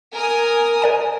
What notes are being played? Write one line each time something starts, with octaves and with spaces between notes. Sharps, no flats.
A#4 G#5 D#6
A#4 D5 G#5